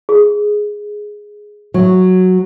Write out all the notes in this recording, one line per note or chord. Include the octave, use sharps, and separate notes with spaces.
G#4
F#3